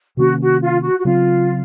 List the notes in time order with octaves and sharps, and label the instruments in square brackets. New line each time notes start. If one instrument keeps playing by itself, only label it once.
[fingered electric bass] C3 D#3 A#3 C#4 [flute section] F#4
[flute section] F#4
F4
F#4
F#4
[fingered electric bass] C#3 F#3 C4 [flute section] F4